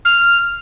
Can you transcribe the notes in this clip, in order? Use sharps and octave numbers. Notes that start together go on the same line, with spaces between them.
F6